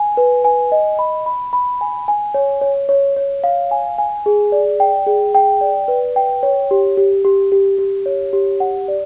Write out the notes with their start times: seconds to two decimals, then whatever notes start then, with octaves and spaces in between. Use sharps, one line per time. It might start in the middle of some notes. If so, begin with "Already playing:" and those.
Already playing: G#5
0.17 B4
0.45 G#5
0.72 D#5
0.99 B5
1.26 B5
1.53 B5
1.81 G#5
2.08 G#5
2.34 C#5
2.61 C#5
2.89 C#5
3.16 C#5
3.44 F5
3.71 G#5
3.98 G#5
4.26 G#4
4.52 D5
4.80 G5
5.07 G#4
5.35 G5
5.61 D5
5.88 B4
6.16 G5
6.43 C#5
6.71 G4
6.97 G4
7.25 G4
7.52 G4
7.78 G4
8.06 C#5
8.33 G4
8.60 F#5
8.88 D5